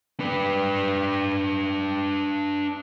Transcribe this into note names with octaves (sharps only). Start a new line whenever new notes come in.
D4 B4